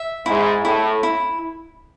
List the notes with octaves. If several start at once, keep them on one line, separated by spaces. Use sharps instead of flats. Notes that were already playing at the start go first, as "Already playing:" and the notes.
Already playing: E5
G#2 E4
A2 E4
E4